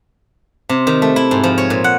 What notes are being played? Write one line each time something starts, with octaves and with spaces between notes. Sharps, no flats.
C3
D#3
A3
E4
G#2
F3
C#5
A#2
F#5